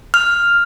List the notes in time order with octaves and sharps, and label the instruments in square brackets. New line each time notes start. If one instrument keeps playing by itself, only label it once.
[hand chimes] F6